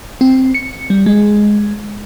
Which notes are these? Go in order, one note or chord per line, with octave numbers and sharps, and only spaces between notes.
C4
C#7
G3
G#3